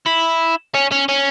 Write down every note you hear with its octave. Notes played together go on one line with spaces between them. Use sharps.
E4
C#4
C#4
C#4